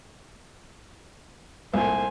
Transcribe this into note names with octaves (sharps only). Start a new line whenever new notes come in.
C2 A#2 A3 C5 G#5